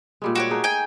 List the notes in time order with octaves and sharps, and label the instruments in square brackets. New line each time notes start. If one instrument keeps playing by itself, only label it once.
[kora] A#2 G3 G#3
[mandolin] F#4 G4 C#5
[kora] A3 D#4 G#4
[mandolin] G5 G#5